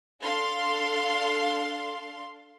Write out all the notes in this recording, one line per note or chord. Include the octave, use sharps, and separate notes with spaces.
D4 A4 F5 C6